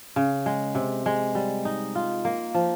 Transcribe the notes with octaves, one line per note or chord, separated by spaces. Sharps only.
C#3
G#3
C3
G#3
G3
D#4
F4
A#3
F3